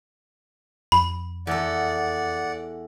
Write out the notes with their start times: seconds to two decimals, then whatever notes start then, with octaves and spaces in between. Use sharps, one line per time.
0.92 F2 B5
1.47 E2 A4 D5 F#5